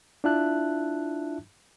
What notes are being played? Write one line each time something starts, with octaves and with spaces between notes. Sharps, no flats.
D4 E4 F4 E5 A5 F#6